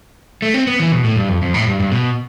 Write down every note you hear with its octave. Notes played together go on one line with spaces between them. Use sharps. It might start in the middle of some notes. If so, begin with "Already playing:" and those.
A3
C4
B3
E3
B2
A2
G2
F2
F2
A2
G2
G2
B2